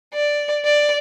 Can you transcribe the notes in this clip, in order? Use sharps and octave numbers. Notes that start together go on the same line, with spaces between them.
D5
D5